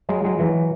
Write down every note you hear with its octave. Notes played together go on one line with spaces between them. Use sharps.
F#3 G#3
F#3 G#3
E3 F#3